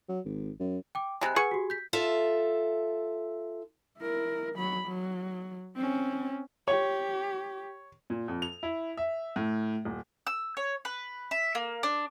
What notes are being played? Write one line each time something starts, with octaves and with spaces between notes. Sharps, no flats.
F#3
G#1
F#2
G5 D6
C3 G#3 G#5 B5 F#6
G#4 B4 F#5 C#6
F#4 G4
G6 B6
F4 A4 E5
E4 A#4
F#3 B5
F#3
C4 C#4
G4 C#5
A#2
F2
F7
E4
E5
A2
D#1
E6
C#5
B4
E5
A#3
D4